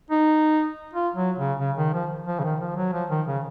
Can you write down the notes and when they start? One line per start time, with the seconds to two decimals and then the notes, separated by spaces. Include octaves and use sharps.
0.10 D#4
0.94 F4
1.16 F#3
1.38 C#3
1.60 C#3
1.77 D#3
1.93 F3
2.27 F3
2.40 C#3
2.44 D#3
2.61 F3
2.77 F#3
2.93 F3
3.10 D#3
3.27 C#3